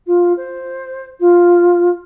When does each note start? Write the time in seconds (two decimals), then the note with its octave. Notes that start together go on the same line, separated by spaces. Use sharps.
0.06 F4
0.37 C5
1.20 F4